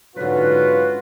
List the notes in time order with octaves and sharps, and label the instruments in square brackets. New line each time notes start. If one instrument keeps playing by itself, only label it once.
[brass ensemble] G#2 C#4 F4 [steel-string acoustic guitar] D3 F#3 [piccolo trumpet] F#4 [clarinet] B4